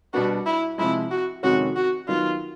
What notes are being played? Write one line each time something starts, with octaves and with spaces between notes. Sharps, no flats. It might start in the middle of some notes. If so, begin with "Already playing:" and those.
B2 G3 B3 D4 F#4
E4
C3 F3 G#3 E4
F#4
F2 C3 D#3 G#3 C#4 F#4
F#4
D#3 F#3 B3 D#4 F4